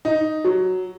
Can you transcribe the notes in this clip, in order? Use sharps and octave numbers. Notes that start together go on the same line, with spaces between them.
D#4
F#3